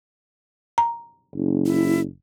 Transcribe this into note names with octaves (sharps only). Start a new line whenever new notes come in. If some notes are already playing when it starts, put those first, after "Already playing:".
A#5
F#1
E4